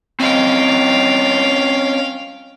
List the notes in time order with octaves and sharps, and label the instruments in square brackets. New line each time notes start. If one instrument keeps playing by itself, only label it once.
[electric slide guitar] C4 C#4 D#5 [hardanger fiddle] F5 G5